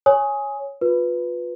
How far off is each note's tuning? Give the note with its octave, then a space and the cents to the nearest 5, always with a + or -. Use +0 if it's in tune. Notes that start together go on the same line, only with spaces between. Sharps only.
C#5 +0 G#5 +0 D#6 +20
F4 +30 B4 +0